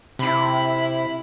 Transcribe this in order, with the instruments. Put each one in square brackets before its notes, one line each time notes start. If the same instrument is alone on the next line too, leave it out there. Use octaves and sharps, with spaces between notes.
[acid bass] C3 [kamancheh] E4 B5